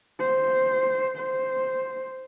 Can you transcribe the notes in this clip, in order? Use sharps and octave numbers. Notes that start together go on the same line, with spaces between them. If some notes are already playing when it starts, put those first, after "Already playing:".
C5
C5